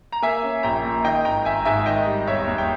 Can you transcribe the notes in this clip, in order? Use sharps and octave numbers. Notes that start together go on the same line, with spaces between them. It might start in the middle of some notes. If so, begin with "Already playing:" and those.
A#5
A#3 E5 G#5
C#4
A#1 G5 A#5
A#2
D#3 D#5 G5
G#1 G5 A#5
G#1 E5 G#5
G#2 E5 G#5
D#3 D#5 G5
G3
E1 C#5 E5
D#2
G5